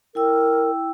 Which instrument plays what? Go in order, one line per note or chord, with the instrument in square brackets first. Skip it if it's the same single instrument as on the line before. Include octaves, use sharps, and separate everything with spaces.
[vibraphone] E4 G5 E6 [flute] A#4